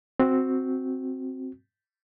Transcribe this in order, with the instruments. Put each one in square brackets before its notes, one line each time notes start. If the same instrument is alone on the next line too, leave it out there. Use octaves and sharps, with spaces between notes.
[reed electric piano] C4 F#4